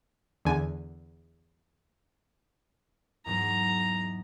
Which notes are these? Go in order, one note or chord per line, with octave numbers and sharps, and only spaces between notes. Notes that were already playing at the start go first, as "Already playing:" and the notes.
E2 D3 G#5
E2 G#2 F#3 A#5